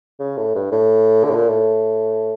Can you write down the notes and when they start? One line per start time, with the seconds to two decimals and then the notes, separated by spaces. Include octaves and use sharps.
0.20 C#3
0.37 A2
0.55 G2
0.72 A2
1.24 D3
1.30 A2
1.36 A#2
1.49 A2